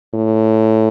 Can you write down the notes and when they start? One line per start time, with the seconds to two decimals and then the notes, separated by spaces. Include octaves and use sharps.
0.15 A2